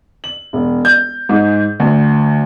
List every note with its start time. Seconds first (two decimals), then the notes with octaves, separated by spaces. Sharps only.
0.24 F#7
0.53 E1
0.85 G6
1.29 G#2
1.80 D2